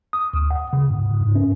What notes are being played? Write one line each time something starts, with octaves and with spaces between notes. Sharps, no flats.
D#6
D2
F#5
C#3
G#2
G2
C#4